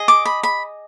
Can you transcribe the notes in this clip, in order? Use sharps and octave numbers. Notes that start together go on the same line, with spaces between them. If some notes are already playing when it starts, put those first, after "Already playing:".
Already playing: G#4 D#5
D6
B5
B5